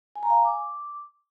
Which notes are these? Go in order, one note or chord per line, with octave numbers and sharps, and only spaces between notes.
G#5
A#5
F5
G#5
D6